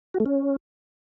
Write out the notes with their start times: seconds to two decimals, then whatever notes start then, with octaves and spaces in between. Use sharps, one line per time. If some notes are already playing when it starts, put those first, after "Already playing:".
0.14 F#4
0.20 A3
0.26 C#4